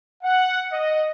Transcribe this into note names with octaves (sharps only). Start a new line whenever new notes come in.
F#5
D#5